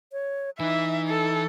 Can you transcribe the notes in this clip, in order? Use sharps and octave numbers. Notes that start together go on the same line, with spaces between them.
C#5
E3 D#4 B4 E5
A4